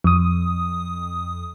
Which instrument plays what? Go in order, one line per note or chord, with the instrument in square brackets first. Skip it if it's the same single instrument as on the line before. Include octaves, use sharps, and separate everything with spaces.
[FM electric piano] F2 D#6